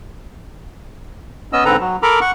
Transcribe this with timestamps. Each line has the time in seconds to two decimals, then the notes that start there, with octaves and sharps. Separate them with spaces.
1.53 B3 C#4 D#5 E6
1.65 G#2 D3 C4 A4 B4 A#5
1.80 F#3
2.03 A4 A#4 A#5 B5 D6
2.21 F#5 C#6